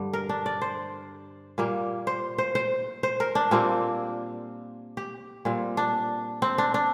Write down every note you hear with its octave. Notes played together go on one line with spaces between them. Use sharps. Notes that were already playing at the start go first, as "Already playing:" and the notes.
Already playing: G2 D3 G3
A#4
D4
D5
C5
A#2 G3 A#3
C5
C5
C5
C5
A#4
D4
A#2 G3 A#3 C4
G4
A#2 G3 C4
D4
C4
D4
D4